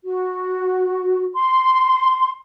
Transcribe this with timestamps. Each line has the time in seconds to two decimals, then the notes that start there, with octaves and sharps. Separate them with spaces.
0.05 F#4
1.34 C6